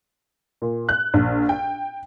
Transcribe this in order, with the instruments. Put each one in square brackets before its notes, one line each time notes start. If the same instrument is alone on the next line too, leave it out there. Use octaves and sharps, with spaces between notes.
[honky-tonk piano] A#2
F#6
A#1
G5